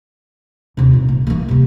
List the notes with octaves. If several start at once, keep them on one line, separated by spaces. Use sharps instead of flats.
D#2 C3
A#2
A#3
E3 A#3
C3 A#3